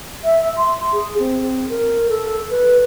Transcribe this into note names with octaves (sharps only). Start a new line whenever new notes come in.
E5
C6
G#4
C4
A#4
A4
B4